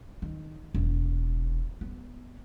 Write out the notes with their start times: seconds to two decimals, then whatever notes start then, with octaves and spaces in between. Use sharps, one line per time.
0.22 D#3
0.74 E1
1.81 B3